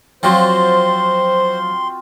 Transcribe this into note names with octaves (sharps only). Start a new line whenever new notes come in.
F3 F#3 C4 F4 F#4 C5 C6